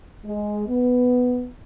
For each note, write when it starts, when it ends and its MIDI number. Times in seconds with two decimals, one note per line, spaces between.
0.25 0.66 56
0.67 1.47 59